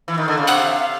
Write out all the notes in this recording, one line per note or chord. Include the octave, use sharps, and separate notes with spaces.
E3
D#3
D3
C#3
C3 F#5
F5
E5
F5